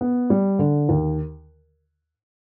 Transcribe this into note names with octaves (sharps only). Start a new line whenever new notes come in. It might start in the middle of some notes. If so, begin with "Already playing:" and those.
B3
G3
D3
D#2